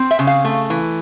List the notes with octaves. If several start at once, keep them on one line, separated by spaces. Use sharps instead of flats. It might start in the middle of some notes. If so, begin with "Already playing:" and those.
Already playing: C4
E5
C#3
F5
A3
E3